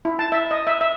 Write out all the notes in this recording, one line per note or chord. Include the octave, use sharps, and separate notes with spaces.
E4
A5
E5
D#5
E5
E5